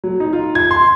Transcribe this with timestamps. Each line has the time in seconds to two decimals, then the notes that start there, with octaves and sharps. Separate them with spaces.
0.04 F#3
0.20 D#4
0.33 F4
0.55 G#6
0.71 C6